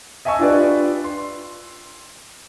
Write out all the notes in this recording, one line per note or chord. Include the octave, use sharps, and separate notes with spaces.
D#5 E5 G#5 A5 C#6 E6
D4 F4 G4 B4 D5
C6